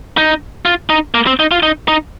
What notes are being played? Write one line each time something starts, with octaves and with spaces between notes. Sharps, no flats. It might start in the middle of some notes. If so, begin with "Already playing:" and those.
D#4
F4
D#4
A#3
C4
D#4
F4
D#4
D#4